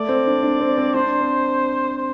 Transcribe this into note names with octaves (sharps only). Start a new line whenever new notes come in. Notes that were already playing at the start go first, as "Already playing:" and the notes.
Already playing: A3 D5
C4
D4
D4
C4
C4
D4 C5
C4
C5